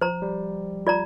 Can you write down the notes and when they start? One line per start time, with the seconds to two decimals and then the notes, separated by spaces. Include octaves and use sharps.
0.01 F3 C5 A#5
0.22 G3
0.87 F4 D5 A#5